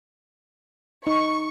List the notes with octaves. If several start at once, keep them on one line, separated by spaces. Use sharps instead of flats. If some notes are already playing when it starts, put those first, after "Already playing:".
D#4 C#6